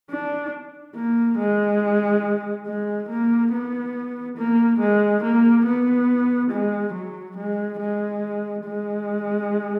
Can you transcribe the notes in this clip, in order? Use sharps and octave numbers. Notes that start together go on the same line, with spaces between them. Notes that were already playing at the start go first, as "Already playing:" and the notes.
D4
A#3
G#3
G#3
A#3
B3
A#3
G#3
A#3
B3
G#3
F#3
G#3
G#3
G#3